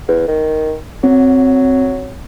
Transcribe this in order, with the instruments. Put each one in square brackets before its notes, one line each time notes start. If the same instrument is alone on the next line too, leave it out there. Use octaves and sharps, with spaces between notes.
[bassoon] E2
D#3
[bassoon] F#3 [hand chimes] C4